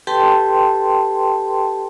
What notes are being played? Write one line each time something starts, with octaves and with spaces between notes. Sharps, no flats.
G4 A4 B4 G5 A5 C6